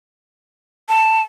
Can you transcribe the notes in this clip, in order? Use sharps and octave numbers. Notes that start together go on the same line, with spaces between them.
A5